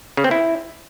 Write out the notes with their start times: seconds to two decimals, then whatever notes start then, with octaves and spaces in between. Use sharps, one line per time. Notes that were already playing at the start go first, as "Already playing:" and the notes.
0.17 C#3
0.24 C4
0.31 E4